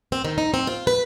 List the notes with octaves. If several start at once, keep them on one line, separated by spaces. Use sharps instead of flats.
C4
D#3
D#4
C4
F4
B4